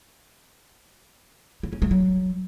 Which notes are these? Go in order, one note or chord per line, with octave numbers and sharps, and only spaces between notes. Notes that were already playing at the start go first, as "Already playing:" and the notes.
E4
C#4
G#3
F#3